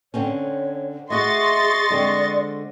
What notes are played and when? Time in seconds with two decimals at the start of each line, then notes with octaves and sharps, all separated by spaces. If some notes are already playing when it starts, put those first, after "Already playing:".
0.14 D3 C4 C#4 C#5
1.10 A3 F#4 G#4 D#5 C6 C#6 A6
1.90 D3 G#3 C4 D5